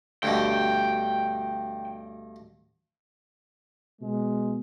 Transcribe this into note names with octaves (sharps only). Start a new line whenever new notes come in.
D2 G2 B2 G5
B2 G#3